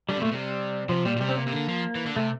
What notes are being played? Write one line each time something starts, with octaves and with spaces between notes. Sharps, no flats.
D3 G3
C3
A#2 A3
C3 G3
C3 F3
A#2 G3
A#2
C3 G3
C4
A#3
C3
D3
F3
E3
D3
C3 A3